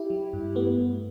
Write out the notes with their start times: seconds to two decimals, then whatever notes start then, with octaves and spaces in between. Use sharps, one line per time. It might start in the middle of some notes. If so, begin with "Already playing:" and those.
Already playing: E4 G4
0.10 F#3
0.33 G2
0.55 A3 B3
0.77 G2